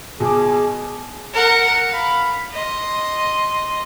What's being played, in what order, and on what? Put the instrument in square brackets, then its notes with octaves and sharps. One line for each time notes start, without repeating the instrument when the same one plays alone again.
[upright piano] B2 D6 [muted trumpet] G#4
[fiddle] A#4 F#5
F5 B5
D#5 C6